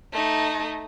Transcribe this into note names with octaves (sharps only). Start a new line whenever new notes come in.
A3 D#4